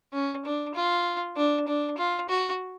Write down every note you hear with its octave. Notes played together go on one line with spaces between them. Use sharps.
C#4
D4
F4
D4
D4
F4
F#4